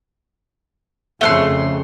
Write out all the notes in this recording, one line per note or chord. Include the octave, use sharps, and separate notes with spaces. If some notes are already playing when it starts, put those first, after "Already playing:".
F2 C#3 A3 F#5 C6